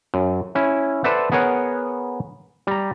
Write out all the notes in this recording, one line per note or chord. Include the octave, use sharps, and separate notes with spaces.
F#2
C#4 E4
A4 B4 C5 D5 E5 F#5
B3 G#4 A#4 C#5 F#5
G3 A#5